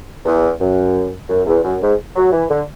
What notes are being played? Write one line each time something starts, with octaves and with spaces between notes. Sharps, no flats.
E2
F#2
F#2
E2
F#2
G#2
F#3
E3
D3